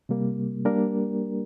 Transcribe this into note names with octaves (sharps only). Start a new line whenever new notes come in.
C3 G3 A#3
G3 A#3 D4 G4 A#4